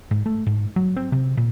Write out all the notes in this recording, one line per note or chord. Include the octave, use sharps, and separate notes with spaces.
G#2
A3
G#2
F#3
C4
C3
A#2